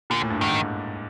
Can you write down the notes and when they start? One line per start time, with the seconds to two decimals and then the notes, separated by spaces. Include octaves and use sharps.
0.10 A#2 D3
0.21 A2
0.30 G2
0.41 G#2 D#3